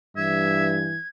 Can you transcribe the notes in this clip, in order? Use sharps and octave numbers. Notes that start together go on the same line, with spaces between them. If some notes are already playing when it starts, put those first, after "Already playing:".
G2 E3 E5 G#6